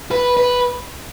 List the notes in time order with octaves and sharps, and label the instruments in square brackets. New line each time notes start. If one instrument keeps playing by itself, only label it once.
[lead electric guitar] B4
B4